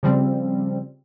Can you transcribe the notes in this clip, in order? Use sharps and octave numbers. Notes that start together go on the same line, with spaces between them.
C#3 F3 G3 C4